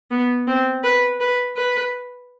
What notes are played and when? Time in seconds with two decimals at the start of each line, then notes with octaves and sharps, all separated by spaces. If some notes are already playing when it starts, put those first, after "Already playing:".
0.11 B3
0.47 C4
0.84 B4
1.20 B4
1.56 B4